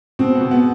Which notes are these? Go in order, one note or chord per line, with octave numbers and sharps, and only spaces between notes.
B2 C4
B3
B2
B3